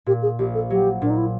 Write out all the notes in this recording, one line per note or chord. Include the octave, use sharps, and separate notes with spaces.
A#2 G4
G#4
A#1 G4
A4
F#3 G4
A#2 D4
D#4
E4